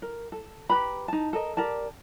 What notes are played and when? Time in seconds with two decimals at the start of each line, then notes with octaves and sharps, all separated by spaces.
0.02 A#4
0.32 A4
0.69 G4 B4 A#5 B5
1.08 D#4 A5
1.33 A4 A#4 D#5
1.57 G4 A#4 D5 A5